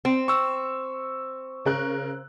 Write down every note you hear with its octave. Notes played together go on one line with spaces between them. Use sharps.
C4
C#6 E6
C#3 A#4 F#6